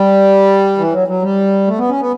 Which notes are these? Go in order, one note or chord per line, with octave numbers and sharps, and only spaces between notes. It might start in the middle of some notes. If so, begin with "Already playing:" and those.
Already playing: G3
E3
F#3
F#3
G3
A3
B3
C#4
B3